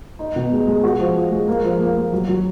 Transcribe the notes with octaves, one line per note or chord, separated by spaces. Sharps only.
D#4
B2
G#3
G#3
F#4
F3
F3
G#3
A#3
F3
A#3
A#3
F#3
F#3